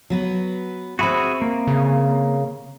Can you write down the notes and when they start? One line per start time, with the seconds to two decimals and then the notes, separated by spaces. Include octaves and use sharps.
0.10 F#3 B3 B4
0.99 C4 F#4 G#4 E5 B5
1.42 A#3
1.67 C#3